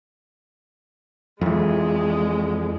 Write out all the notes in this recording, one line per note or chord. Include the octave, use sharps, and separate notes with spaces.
F2 E3 G#3